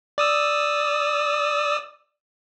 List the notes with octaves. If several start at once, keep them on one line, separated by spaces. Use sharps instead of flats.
D5 D#6 E6